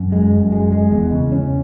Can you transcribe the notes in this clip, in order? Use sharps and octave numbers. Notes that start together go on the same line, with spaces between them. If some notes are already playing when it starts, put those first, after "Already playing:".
Already playing: F#2
G#3
F#2
G#3
G#3
E2
C#3
C#4